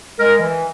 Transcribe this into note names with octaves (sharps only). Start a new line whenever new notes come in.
G#3 A#4
E3